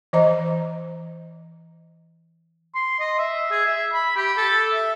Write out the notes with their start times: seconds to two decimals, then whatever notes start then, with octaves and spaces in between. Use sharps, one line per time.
0.13 E3 C5 D#5 A#5
2.75 C6
3.00 D#5
3.19 E5
3.51 G#4
3.65 E5
3.93 B5
4.16 G4
4.37 A4
4.74 E5